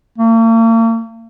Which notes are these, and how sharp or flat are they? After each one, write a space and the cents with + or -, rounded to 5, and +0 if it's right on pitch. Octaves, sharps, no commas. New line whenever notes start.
A#3 -45